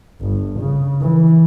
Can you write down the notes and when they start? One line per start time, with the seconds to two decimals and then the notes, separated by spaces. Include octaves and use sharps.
0.21 G1
0.60 C#3
1.01 E3